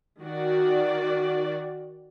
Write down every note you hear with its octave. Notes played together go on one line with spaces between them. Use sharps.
D#3 F#4 D5